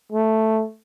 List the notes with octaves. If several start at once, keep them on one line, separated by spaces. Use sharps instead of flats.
A3